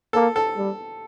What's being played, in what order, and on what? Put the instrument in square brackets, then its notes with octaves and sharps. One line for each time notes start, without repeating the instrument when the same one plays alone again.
[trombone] A#3 [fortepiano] A4
[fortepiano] A4
[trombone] G3